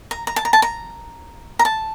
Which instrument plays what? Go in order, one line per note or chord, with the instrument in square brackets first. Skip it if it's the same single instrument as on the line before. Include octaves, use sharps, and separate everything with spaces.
[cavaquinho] A#5
A#5
A5
A#5
A5
A#5
A#5
A5